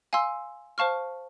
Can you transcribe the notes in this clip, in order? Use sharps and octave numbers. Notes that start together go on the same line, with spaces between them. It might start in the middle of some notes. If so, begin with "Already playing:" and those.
F5 G#5 C6 E6
C5 F5 A5 C#6 F6